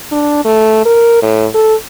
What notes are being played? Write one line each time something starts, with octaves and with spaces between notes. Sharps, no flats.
D4
A3
A#4
A2
A4